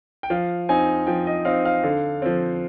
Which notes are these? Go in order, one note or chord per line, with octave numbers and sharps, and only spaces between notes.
G5
F3 F5
C4 D#4 G#5
F3 G5
D#5
C4 D#4 F5
F5
D3
F3 C4